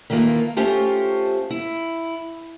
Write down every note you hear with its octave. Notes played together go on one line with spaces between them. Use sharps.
D#3 E3 A3 A#3 F4
A3 C#4 F4 G4 C5 A5
E4